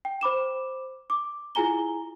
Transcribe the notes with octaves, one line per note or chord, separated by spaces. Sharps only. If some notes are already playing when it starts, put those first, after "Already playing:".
G5
C5 B5 D6 E7
D6
E4 F4 G#4 G#5 A#5 G7